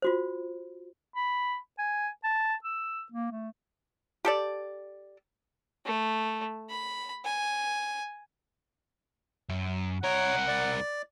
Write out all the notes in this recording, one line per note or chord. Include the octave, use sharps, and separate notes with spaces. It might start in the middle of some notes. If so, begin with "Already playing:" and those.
F4 F#4 C5
B5
G#5
A5
E6
A#3
A3
G4 A4 D5
A3
B5
G#5
F#2
C2 A#4 C#5 F#5
D5